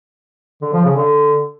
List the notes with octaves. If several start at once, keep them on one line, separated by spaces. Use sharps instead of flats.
D3
F3
C#3
D3